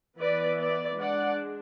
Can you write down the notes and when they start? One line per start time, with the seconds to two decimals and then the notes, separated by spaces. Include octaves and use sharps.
0.19 E3 B3 E4 B4 D5
0.59 B4 D5
0.99 G#3 D4 D5 F#5